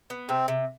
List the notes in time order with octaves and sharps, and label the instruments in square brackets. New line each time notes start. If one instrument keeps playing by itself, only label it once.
[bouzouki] B3
[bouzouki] C3 [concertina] C4
[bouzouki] C3